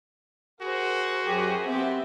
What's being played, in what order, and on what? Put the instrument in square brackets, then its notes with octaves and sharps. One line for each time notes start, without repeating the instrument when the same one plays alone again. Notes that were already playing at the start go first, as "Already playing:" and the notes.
[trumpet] F#4 [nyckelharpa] G#4 [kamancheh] A#4 C5
[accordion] F#2 G4 [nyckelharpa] G#4
[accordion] B3 [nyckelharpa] C4 G4 [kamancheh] E5